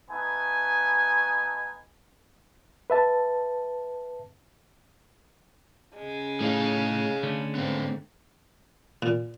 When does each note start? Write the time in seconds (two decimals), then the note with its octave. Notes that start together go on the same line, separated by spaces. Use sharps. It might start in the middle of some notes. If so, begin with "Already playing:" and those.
0.10 A3 B3 D#4 G#5
2.90 B4 E5 A5
5.96 C#3 G#3
6.41 A2 D#4 G#4 C#5 F5
7.23 D3 A3 C#4
7.55 G#2 G#3 B3 C4
9.02 A#2